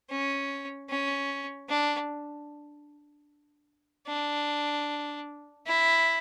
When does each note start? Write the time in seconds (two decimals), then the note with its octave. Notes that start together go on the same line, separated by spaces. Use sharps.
0.10 C#4
0.89 C#4
1.69 D4
4.07 D4
5.66 E4